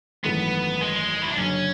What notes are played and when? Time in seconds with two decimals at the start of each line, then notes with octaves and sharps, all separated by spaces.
0.24 G#1 F#2 E3 A3 B3
0.81 G#3
1.22 E4
1.30 D4
1.37 F#1 F#2 D3 C#4